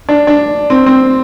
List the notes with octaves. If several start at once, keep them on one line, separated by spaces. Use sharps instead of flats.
D4
D4
C4
C4